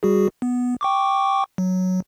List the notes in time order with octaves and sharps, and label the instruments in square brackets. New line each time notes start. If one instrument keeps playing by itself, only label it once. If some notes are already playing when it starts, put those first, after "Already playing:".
[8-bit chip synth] G3 F#4 G#4
B3
G5 C#6 D6
F#3